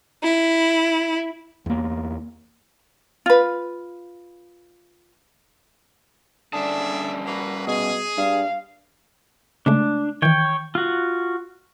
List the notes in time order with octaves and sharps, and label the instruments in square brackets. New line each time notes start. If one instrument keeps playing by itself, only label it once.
[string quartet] E4
[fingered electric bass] E2 A#3
[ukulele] F4 B4
[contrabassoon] D3 [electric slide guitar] G3 C#4 A5 [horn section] G#4 D5 E5
[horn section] A#3 F#4 B4
[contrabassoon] B2 [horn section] G#4
[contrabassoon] G2 [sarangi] F5
[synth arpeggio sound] C#3 G#3 A3 [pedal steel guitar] D4
[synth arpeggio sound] D#3 E3 [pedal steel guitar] C#5 G5
[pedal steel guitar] F4 F#4